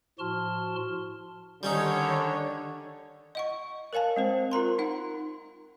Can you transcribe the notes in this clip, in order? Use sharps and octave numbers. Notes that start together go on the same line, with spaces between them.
A2 F3 F#4 A5 C6 F6
D3 D#3 G3 C#4 D#4 C#5
D#5 F#5 C#6
A#4 C#5 F5 G#5 A5
G#3 C4 C5
F4 A#4 A#5 C6
D#4 F#5